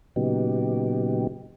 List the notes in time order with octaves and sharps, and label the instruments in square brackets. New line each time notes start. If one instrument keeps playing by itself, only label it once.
[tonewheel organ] A#2 C#3 F#3 B3 D#4 G4